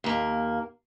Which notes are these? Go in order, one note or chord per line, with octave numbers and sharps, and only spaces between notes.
D#2 A#3